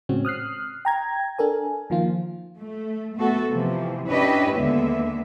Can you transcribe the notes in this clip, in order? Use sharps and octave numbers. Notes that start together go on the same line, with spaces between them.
A2 C#3 G#3 C4 C#4 F#4
D#6 F6 F#6 C7
G5 A#5 G#6
D4 A4 A#4 G#5
D#3 F3 A#3 F4
A3
A3 B3 F#4 A4
C3 E3 F3
C#4 D4 E4 G4 B4 D#5
D#2 D3 G#3 A#3 B3 E5